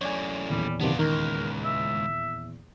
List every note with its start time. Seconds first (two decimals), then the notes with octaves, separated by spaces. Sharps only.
0.01 F#2 A2 C#5 D5 G#5
0.49 D#1 E2 G3
0.81 F#2 C3 D#3 B3 D4 F4
0.99 C#2 D#3 A#4
1.64 E5